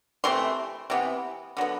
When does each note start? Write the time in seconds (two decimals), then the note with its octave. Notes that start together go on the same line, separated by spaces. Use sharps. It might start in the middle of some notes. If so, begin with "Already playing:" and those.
0.24 C3 E3 A3 C4 C6
0.90 C3 E3 B3
1.57 D3 F#3 B3